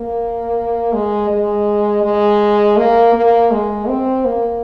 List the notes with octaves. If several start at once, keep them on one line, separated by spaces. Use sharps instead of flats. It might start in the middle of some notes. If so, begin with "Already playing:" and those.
Already playing: A#3
G#3
G#3
G#3
A#3
A#3
G#3
C4
A#3